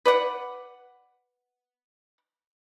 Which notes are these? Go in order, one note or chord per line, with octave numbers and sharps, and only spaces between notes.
B4 D5 F#5